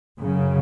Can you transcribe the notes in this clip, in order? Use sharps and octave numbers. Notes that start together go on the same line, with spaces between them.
F#2 C#3